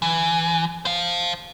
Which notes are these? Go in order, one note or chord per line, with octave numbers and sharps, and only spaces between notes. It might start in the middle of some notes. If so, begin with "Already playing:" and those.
E3
C5 F5